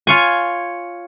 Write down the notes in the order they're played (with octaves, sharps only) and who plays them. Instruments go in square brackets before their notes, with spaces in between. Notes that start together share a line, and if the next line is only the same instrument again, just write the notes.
[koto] F4 C#5 G#5